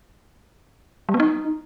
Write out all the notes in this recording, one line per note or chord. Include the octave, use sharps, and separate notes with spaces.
G3
B3
D#4